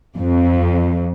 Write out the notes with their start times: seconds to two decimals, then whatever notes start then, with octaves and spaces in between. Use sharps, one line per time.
0.17 F2